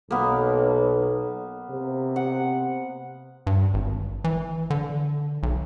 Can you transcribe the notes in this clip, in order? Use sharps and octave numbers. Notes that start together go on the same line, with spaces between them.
B1 A#3 B3
C3
F#5
G2
G#1
E3
D3
B1